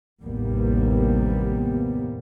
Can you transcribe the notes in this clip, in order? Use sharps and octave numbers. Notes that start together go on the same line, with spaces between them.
A1 D#2 C3 G3 A#3 B3